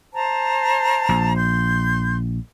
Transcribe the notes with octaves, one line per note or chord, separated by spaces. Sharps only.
C5 A5 A#5
A#1
C6 G6